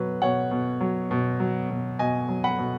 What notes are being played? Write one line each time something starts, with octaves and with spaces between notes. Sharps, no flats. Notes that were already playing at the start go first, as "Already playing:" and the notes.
Already playing: B2 F#3 B4
B2 C#5 F#5
B2
F#3
B2
F#3
B2
B2 D#5 G#5
F#3
F#5 B5
B2